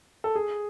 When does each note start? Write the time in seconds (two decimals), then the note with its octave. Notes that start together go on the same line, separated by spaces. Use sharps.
0.24 A4
0.35 G#4